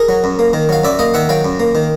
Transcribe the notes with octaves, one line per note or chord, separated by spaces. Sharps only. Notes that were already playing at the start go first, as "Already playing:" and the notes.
Already playing: G#4 A#4
F#3
F#2
A#3
D#3
F#3 F5
F#2 D5 E5
A#3 D#5 F5
D#3 E5 F#5
F#3 F5 G5
F#2
A#3
D#3